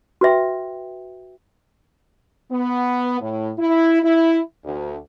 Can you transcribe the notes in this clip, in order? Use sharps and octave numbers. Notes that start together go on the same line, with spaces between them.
F#4 B4 E5 G5
B3
A2
E4
E4
D2